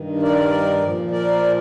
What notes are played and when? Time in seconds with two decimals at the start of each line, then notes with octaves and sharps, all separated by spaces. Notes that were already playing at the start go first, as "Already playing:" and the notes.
Already playing: G2 D#3
0.23 A#4 D5
0.82 A#2 F3
1.11 A#4 D5